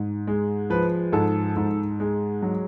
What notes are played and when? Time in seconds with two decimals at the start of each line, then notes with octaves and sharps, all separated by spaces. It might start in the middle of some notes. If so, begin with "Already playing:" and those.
Already playing: G#2
0.27 G#3
0.70 F3 B4
1.12 G#2 A4
1.56 G#2
2.00 G#3
2.42 F#3